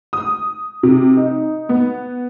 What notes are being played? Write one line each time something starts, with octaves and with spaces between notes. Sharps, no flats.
D#6
C3
D#4
B3